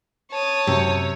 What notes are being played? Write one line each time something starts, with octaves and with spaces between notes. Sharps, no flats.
C#5 A5 D#6
F#2 C3